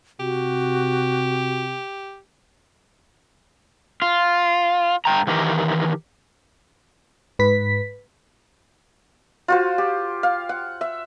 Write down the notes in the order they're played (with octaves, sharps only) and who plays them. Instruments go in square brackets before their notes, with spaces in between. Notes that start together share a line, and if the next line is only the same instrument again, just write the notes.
[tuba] C3 [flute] F#4 [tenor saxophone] G4
[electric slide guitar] F4
G2 G5 A#5
D#3 E3 G4 A#4
[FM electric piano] G#2 B4 B6
[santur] F4 F#4 C5
G4
F5
F#5
E5